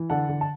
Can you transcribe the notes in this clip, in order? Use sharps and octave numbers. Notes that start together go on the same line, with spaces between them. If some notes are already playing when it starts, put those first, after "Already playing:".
Already playing: E3
D3 F#5 A5
D3
A5